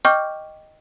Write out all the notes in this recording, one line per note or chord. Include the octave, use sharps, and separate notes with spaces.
D#5 G5 C#6 D6 F6 G6